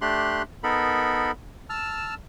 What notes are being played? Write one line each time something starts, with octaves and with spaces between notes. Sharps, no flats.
A3 D4 G4 C6 F#6
B3 D#4 A4 A#4 B5
A5 E6 F6